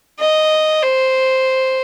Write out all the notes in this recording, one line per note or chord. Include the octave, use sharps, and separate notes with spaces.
D#5
C5